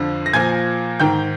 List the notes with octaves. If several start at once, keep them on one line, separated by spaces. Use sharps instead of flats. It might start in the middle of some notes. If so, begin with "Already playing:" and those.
Already playing: F2 D3 F3
A#6
A#2 F3 G#5 G#6
G#2 D#3 G5 G6